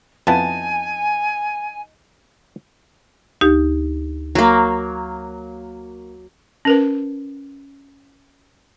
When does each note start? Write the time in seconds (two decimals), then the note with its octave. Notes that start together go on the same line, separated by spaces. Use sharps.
0.27 F2 B3 D#4 E4 G#5 A5
3.41 D2 D#4 G4
4.35 F#3 A#3
6.65 C#4 A#4 B4